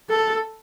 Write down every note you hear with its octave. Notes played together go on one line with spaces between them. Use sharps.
A4